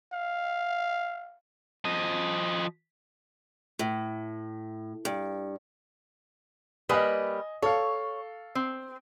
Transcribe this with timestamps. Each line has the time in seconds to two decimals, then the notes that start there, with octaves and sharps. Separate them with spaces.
0.13 F5
1.85 F3 D#5
3.79 A2
5.05 G2
6.89 G3 A#3 B4 D#5 G#5 D#6
7.62 A4 C#5 F5
8.55 C4